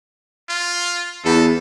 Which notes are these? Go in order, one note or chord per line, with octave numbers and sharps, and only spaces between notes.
F4
E2 A4